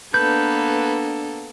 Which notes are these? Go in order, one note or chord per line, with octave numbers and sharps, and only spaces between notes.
A#3 B3 D4 A4 B4 G6